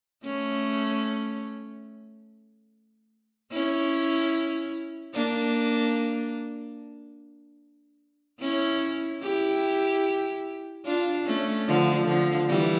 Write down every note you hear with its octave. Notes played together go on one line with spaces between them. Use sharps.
A3 C#4
C#4 E4
A#3 D4
C#4 E4
E4 G4
D4 F4
A3 C#4
D3 F3
D3 F3
E3 G3